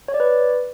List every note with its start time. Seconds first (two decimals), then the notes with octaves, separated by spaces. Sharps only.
0.08 C#5
0.14 D5
0.20 B4